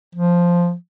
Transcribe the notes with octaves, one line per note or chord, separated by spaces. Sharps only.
F3